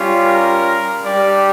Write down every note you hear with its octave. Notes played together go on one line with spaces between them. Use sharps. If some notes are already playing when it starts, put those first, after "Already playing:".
Already playing: G3 C#4 F4
A#4
G3 D4 G4 D5